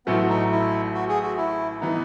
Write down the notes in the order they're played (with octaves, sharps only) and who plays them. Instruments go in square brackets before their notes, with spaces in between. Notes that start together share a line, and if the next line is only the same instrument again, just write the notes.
[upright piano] A1 A2 F#3 A3 [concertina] B3
[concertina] D#4
E4
F#4
G#4
F#4
E4
[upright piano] E3 B3 [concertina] D#4